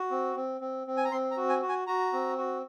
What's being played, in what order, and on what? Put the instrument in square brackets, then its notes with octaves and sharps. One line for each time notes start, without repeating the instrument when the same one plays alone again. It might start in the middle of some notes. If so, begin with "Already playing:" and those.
Already playing: [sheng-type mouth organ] F#4
C4
C4
C4
C4
G#5
A#5
C4 C6
A#5
F#4
G#5
F#4
G#5
F#4 A#5
C4
F#4